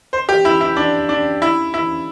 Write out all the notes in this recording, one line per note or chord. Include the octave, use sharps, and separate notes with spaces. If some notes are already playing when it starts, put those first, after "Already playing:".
C5
G4
E4
E4
D4
D4
E4
E4